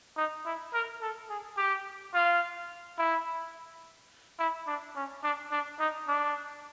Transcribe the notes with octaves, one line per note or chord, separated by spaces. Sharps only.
D#4
E4
A#4
A4
G#4
G4
F4
E4
E4
D4
C#4
D4
D4
D#4
D4